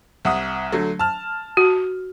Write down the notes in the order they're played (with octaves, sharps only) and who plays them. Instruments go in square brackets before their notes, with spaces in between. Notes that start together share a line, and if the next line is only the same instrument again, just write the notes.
[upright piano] C2 F#5 D#6
D3 F#3 A3
A5 F6
[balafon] F#4